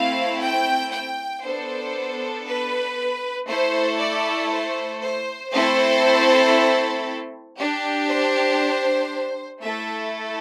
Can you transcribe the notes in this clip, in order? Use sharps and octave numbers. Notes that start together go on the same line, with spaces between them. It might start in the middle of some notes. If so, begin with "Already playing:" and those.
Already playing: A3 C4 E4 F5
G5
G5
B3 D4 A4 C5
B4
A3 E4 A4 C5
D5
C5
C5
A3 C4 E4 A4 C5
D4 G4
C5
A3 E4 A4 E5